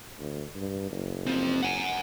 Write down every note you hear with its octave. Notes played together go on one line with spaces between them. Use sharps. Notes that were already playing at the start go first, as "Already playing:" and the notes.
D2
G2
F#1
F3 C4
F#5 G#5